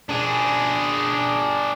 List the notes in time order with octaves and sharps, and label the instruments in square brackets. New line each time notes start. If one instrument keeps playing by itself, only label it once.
[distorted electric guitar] D4 G#4